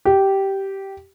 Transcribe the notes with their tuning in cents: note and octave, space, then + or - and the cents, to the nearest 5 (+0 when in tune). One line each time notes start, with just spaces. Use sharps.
G4 -10